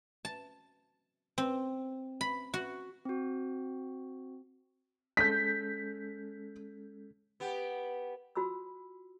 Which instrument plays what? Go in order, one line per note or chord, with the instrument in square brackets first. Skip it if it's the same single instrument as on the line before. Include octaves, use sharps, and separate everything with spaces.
[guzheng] A5
C4
B5
F#4
[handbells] C4 F#4
[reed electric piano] G#3 C#4 A4 [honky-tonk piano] G6 B6
[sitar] B3 G4
[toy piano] F4 F#4 B5 D#6 E6